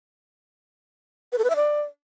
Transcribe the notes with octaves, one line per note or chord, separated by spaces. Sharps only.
B4
A4
B4
E5
D5